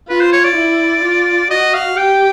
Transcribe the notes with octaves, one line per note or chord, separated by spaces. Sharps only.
F4 B4
C5
C#5
D5
E4
F4
F#4 D#5
F5
G4 G5